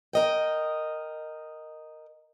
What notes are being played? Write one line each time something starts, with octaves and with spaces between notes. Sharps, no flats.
A#4 D#5 G5